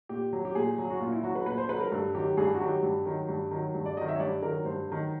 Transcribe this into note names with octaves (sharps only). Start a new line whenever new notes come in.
A#2 G4
F#3
G4
A#2 G#4
F#3
F#4
A#2 F4
E4
F#3 F#4
B4
A#2 B4
C5
F#3 B4
A#4
G2 A4
D#3 F#3 G4
G2 G#4
G4
F#4
D#3 F#3 G4
G2
D#3 F#3
G2
D#3 F#3
G2
D5
D#3 F#3 D#5
E5
C#5
G2 D5
D#3 F#3 A#4
G2 C5
D#3 F#3